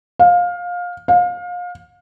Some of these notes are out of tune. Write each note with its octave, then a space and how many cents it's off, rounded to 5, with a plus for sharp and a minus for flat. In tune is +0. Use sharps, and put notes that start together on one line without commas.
F5 +20
F5 +30